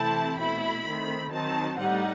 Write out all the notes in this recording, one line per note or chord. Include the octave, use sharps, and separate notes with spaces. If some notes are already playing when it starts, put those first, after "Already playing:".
Already playing: C3 E3 A3 C4 E4 A5
B2 A3 E4 B5
D#3 A3 C4
D#3 F#3 C4 D#4 A5
A2 G3 D#4 F#5